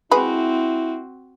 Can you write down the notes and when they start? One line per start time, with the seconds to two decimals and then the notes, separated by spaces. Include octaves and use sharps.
0.11 G#3 C4 E4 F#4 G#4 B4